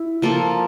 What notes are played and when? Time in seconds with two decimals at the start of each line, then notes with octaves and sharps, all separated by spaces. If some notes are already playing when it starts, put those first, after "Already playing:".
Already playing: E4
0.22 F3 A#3 F4 A4